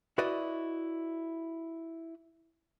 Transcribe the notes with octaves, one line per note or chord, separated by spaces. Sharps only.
E4 F#4 B4 D5 D#5